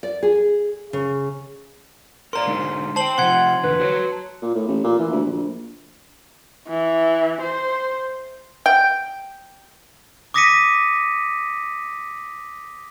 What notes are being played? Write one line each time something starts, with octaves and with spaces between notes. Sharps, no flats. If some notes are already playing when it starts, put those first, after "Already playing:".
D5
G#4
C#3
A#4 C5 D5 A#5 C6
D3 G#3 D#4
C5 G5 A5 C6 F#7
C3 E3 F3 F#5 C6 G#6
E2 D3 B4
F#4 C5 C#5
A#2
A2
A1
A#2
E3
D2
A#1
E3
C5
G5
D6 D#6 A#6 B6 C#7 D#7